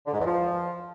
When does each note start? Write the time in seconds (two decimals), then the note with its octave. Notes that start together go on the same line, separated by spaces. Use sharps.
0.06 D3
0.13 G#2
0.19 E2
0.25 F3